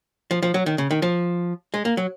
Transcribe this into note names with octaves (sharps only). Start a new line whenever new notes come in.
F3
F3
F#3
D#3
C#3
D#3
F3
G#3
A#3
F#3